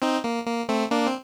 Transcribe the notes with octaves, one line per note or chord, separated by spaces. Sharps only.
C4 D#4
A#3
A#3
A3 C4
A#3 D4
C4